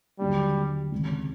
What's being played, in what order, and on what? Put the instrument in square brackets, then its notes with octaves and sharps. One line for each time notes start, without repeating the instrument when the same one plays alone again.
[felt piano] D#2 D3 F#3 A#3 D4 [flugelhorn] G3
[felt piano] C#2 C3 D#3 G#3